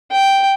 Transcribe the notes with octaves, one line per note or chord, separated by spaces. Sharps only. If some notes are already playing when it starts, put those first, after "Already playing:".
G5